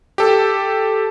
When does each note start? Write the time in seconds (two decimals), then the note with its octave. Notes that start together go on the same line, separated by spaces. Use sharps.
0.18 G4 A4